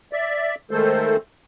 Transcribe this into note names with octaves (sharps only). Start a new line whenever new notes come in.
D5 E5
D#3 G#3 A3 A4 C5